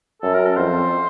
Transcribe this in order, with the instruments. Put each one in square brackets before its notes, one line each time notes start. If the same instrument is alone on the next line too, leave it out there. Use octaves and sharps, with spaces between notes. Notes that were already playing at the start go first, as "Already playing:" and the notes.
[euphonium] F#2 [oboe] A4
[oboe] A#4
A4
[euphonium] F2 [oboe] C5